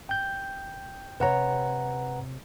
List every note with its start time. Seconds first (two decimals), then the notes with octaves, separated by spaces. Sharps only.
0.09 G5 G6
1.20 C3 B4 C#5 F#5 A#5